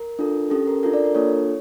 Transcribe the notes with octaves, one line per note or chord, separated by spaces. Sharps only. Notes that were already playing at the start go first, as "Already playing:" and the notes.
Already playing: A#4
D4 F4 A4
C#4 G4 A4
A#4
D4 F4 A4 A#4
D5
A#4
A#3 D4 F4 A4 C#5